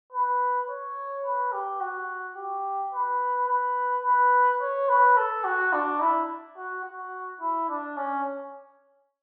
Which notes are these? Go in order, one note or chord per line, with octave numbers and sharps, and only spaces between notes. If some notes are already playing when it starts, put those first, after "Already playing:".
B4
C#5
B4
G4
F#4
G4
B4
B4
B4
C#5
B4
A4
F#4
D4
E4
F#4
F#4
E4
D4
C#4